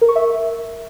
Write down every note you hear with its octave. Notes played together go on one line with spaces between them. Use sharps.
A#4
C#6
E5